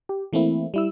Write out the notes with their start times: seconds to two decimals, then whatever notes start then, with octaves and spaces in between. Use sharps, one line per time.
0.09 G4
0.33 E3 A3 A#3 C4 E4
0.74 G3 E4 E6